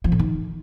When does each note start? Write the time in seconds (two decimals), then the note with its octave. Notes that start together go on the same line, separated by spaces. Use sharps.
0.04 F3
0.12 A2
0.19 D#3